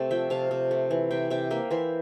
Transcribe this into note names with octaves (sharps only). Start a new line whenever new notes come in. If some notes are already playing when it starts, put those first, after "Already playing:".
Already playing: C3 A3 C4 A5
F3 E5 G5
C3 F5 A5
C3
A3
E3
C3 E5 G5
C3 E5 G5
A#3 E5 G5
E3 C5 E5